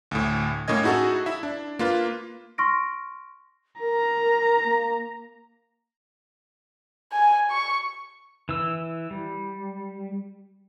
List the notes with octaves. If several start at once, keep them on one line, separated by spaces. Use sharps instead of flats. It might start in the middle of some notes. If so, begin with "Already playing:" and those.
D2 A2
A2 A#3 C#4 D#5 G#6
D#4 E4 F#4 G#4 A4
E4 E5
D4
A#3 F4 B4
C6 C#6 F6 A#6 D7
A#4 A#5
A#3
G#5
C#6
E3 E6
G3